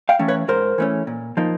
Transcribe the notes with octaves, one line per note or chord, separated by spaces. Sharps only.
F5 G5
E3 A3 C#4
B4 C#5
G#2 A#4 C5
E3 A3 C#4
A#2
F3 A#3 D#4